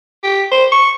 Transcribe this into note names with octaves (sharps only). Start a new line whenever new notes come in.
G4
C5
C#6